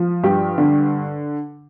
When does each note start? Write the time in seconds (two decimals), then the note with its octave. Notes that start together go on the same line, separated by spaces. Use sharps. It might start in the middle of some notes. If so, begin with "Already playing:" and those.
Already playing: F3
0.23 G2 G4
0.58 D3